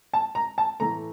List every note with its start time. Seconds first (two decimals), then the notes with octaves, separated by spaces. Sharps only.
0.13 A5
0.35 A#5
0.58 A5
0.80 A2 E3 A3 A#5